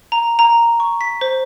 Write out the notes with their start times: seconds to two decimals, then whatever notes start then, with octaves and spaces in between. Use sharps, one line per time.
0.12 A#5
0.39 A#5
0.80 C#6
1.01 B6
1.21 C5